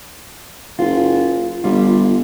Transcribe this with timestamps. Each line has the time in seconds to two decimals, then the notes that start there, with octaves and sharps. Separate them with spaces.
0.79 F#1 F4
1.64 G1 G3 F4